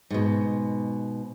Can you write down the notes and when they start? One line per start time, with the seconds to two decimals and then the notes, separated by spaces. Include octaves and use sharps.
0.11 G#2 B2